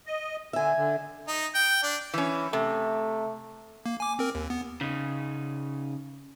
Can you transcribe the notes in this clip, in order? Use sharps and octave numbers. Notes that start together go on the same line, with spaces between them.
D#5
D3 E5 G#5
D3
D#4
G5
D4
E3 C#4
C3 A3
A#3
G#5 D6
C4 A#4
D#2
B3
C#3 D#4